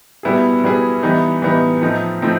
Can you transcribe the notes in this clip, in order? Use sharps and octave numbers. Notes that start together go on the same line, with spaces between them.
B2 G3 B3 E4 G#4
B2 G3 B3 E4 G#4
E3 G3 B3 D#4
E3 G3 B3 D#4
A2 F3 A3 C4 D#4
A2 F3 A3 C4 D#4